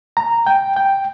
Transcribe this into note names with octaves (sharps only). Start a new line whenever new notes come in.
A#5
G5
G5